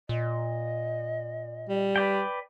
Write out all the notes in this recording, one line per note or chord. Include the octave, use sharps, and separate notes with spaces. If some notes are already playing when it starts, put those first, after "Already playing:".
A#2 D#5
G3
B4 D5 G5